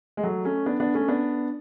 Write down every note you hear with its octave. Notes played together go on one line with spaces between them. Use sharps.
G#3
F#3 A3
A3 C#4
B3 D4
B3 D4
A3 C#4
B3 D4